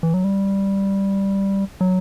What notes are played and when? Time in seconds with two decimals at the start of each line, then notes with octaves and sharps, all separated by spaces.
0.03 E3
0.14 F#3
0.24 G3
1.81 F#3